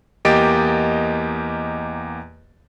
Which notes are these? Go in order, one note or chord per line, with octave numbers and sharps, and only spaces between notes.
E2 A#3 G4 D#5 A6 D7